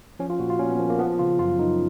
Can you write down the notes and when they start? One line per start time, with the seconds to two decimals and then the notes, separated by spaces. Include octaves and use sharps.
0.19 F3 C#4
0.30 F4
0.40 A#2 F#4
0.50 F4
0.59 A#2 C#4
0.69 B3
0.79 F3 A#3
0.90 A#3
0.99 F3 B3
1.19 C#3 F4
1.39 F#2 F4
1.59 F#2 D#4